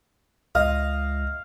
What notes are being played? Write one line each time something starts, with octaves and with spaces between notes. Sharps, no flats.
C#2 D#5 F5